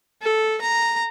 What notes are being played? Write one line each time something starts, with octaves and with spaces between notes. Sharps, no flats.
A4
A#5